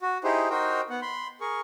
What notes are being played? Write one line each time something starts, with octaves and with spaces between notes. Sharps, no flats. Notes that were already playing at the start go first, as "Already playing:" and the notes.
F#4
D#4 E4 G4 G#4 C5
D#4 F#4 A#4 C5 G5
B3 F#5
B5 C6
G#4 A#4 C#6